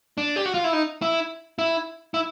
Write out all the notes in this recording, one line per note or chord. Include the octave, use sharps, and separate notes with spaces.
D4
G4
F#4
F4
E4
D#4
E4
E4
E4